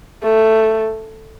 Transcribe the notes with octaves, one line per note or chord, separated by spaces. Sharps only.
A3